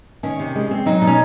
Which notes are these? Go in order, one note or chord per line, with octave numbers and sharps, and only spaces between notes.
D#3 C#4
C3
G#3
C4
F#3 D#4
B2
C#4